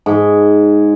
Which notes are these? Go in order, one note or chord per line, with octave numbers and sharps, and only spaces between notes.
G#2